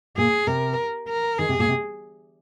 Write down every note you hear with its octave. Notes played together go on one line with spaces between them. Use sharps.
A#2 G#4
C3 A#4
A#4
D#3 G#4
C3
A#2
C3